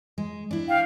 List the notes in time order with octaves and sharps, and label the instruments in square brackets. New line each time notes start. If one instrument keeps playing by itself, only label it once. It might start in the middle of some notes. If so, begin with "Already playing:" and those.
[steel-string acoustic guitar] G#3
D4 E4
[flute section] F5 G5